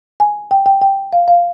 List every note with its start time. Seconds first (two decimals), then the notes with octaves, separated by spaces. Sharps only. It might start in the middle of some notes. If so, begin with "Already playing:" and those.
0.20 G#5
0.51 G5
0.66 G5
0.82 G5
1.13 F5
1.28 F5